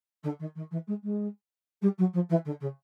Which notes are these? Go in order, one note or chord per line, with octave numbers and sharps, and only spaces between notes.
D3
D#3
D#3
E3
G#3
G#3
G3
F#3
F3
E3
D3
C#3